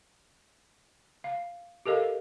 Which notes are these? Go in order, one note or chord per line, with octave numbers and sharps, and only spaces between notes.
F5
G4 A4 A#4 D#5 F5